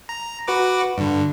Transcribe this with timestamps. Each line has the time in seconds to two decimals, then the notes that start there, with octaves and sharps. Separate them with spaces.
0.09 A#5
0.48 F#4 B4 D6
0.98 G2 D3